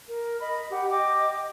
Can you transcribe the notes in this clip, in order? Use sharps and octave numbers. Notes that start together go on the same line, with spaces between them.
A#4
D#5 B5
G4 F#5
D#5 G5 D6